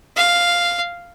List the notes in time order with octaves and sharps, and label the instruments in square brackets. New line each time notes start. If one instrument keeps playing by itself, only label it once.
[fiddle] F5